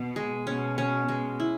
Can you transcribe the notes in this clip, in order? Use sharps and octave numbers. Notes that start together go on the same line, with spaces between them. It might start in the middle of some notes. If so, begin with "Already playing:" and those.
Already playing: B2
G#3
B2 C#4
C#4
G#3
E4